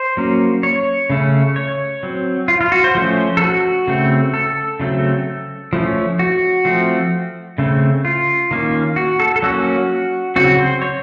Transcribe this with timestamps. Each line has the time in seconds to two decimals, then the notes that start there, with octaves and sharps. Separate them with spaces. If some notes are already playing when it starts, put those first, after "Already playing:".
Already playing: C5
0.17 F#3 A#3 C#4
0.63 C#5
1.10 C#3 A3 C#4
1.56 C#5
2.03 F#3 C4
2.48 F4
2.61 F4
2.72 F#4
2.84 C5
2.95 F3 A3 C#4
3.37 A4
3.41 F#4
3.88 C#3 A3 C4
4.34 A4
4.80 C#3 F#3 A3 C4
5.73 F3 A3 C#4
6.19 F#4
6.65 F3 A3 C4
7.58 C#3 A3 C4
8.05 F4
8.51 D#3 A#3 C#4
8.96 F#4
9.20 A4
9.36 A4
9.42 F#3 A#3 C#4 F#4
10.36 C#3 F#3 C4 F#4
10.59 C5
10.82 C#5